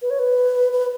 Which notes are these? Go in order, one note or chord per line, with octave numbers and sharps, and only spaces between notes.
B4
C#5
B4
B4